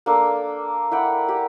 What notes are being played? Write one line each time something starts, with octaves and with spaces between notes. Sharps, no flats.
A#3 D4 A4
E4 F#5 G5
G4